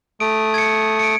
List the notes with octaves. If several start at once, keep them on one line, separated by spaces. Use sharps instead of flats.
A3 D#6 D7
G#6 C#7
C#7 D7